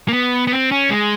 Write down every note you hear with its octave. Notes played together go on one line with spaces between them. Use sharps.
A#3
B3
B3
C4
C#4
G#3